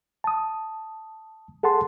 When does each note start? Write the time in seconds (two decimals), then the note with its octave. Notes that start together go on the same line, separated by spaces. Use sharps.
0.24 A5 D#6
1.63 G#4 A4 F#5 A5 C6